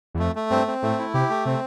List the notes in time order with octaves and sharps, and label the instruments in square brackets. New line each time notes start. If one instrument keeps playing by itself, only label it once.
[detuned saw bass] E2
[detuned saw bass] F2 [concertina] A3
[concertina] A3
[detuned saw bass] G2 [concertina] C4
[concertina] C4
[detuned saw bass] A2 [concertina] A3
[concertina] E4
[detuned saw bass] C3 [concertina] G4
[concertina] A3
[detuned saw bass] C3 [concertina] C4